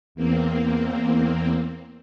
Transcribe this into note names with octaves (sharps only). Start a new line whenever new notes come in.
E2 A#3 C4